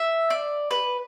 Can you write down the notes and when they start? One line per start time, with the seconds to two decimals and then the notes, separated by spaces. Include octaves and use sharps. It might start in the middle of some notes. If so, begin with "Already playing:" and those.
Already playing: E5
0.30 D5
0.71 B4